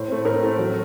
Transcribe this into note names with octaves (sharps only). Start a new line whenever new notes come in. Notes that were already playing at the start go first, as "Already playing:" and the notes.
Already playing: A2 C5
A3 C4
A2 A#4
A3 C4
F#3